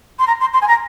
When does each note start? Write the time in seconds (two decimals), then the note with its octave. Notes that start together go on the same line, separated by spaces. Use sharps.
0.19 C6
0.27 A#5
0.41 C6
0.54 C6
0.62 G#5
0.68 A#5